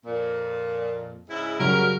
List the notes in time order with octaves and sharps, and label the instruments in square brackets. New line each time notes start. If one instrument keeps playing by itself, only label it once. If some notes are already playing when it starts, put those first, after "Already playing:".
[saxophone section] F2 A#2
G#2 C#3 E4
[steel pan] C#3 F#3 F#4 [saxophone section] G3 C#4 A#4